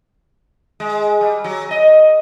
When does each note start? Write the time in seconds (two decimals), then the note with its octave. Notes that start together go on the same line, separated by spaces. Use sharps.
0.80 G#3
1.21 G3
1.44 F#3
1.71 D#5